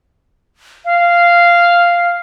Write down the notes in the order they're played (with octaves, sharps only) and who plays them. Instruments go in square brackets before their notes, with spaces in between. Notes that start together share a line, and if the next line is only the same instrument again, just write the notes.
[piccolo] F5